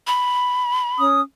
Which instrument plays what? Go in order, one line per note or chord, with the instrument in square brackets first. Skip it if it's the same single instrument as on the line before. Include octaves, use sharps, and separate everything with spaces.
[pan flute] B5
[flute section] C#4 D#6